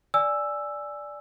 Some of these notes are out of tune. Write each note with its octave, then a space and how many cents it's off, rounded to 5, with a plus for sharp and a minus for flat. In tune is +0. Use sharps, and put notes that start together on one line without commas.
D5 +0 G#5 -5 E6 +5